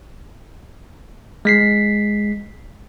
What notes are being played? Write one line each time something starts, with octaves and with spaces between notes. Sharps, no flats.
G#3 B6 C7